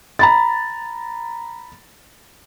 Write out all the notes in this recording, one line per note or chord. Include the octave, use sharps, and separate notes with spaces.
A#5 B5 A6